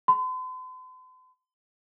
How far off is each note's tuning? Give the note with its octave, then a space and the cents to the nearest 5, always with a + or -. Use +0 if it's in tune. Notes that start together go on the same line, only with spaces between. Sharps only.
C6 -45